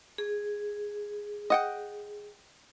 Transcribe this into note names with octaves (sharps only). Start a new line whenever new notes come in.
G#4
D#5 F#5 G5